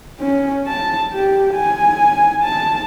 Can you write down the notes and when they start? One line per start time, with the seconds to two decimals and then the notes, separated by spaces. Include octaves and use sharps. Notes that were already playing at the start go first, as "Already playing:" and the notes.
0.20 C#4
0.67 A5
1.13 G4
1.54 G#5
2.43 A5